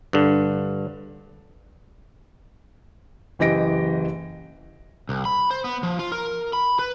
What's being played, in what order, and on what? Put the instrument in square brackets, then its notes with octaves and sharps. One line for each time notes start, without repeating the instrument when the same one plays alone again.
[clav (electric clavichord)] G2 D3
[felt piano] F#1 E3 G4 D#5 A#6 D7
[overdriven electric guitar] C2
B5
C5
B3
F3
F4
A#4
B5
B4